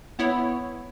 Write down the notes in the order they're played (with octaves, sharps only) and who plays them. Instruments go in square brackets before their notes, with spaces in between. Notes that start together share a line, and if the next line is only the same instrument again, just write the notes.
[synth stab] B3 E4 C#5